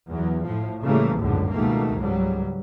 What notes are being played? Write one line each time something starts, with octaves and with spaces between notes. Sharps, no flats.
E2 F#3
A2 F3
C#3 E3 G3 A3 A#3
G#1 C#2 F#2 A2 D3
C#2 B2 D#3 A3 A#3
C#2 G#2 F#3 G3